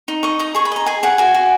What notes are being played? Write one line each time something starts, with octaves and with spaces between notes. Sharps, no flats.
D#4
D#5 C#6
D#4 D#6
G#4 C#6
B5
D#5 A#5
G#4 G#5
G#4 F#5
F#4 G#5
F#4